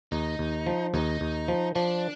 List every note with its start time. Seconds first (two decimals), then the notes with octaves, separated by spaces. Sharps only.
0.12 D#2 D#4
0.39 D#2
0.66 F3
0.94 D#2 D#4
1.21 D#2
1.48 F3
1.76 F3 D4